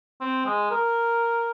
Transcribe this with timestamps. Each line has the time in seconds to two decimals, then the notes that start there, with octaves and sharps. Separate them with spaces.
0.21 C4
0.46 G#3
0.71 A#4